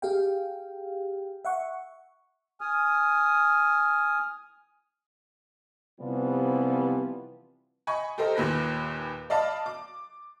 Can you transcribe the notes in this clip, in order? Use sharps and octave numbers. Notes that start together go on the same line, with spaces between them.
G4 G#4 F5 G5
E5 F#5 C#6
G#5 D#6 F6
C3 E3 F3 G3 B3 C4
D#5 G#5 B5 C#6
G4 A4 A#4 C5 D#5
D#2 A#2 B4 A#6
D5 D#5 F5 A5 B5 D6
D6